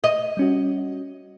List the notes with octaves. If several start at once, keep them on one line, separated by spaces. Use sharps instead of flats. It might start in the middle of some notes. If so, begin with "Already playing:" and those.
D#5
G3 C#4 F#4